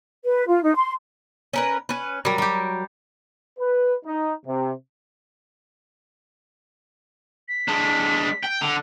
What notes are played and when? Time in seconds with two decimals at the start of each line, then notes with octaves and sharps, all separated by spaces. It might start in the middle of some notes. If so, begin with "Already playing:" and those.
0.25 B4
0.48 F4
0.63 D#4
0.75 C6
1.53 C#4 A#4 B4
1.89 C#4 B4
2.25 F#3 G3 A#4
2.38 G3 G4
3.59 B4
4.05 D#4
4.46 C3
7.49 B6
7.68 G#3 D4
8.43 G5
8.61 D3 F7